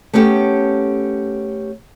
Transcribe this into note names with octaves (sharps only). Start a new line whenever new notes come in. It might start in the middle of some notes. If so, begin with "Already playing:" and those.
A3 B3 C#4 G4 A4